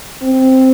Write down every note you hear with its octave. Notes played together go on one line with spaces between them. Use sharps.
C4